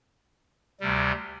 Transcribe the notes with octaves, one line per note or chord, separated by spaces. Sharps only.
D2 C3 G3